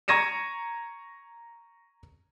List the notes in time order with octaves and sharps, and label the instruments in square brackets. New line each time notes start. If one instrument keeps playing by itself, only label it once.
[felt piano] A#5 C#6 G#6 A#6 D#7 E7